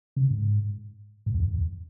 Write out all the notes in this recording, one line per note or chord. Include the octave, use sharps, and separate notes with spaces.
C#3
G#2
G#2
E2
F#2
E2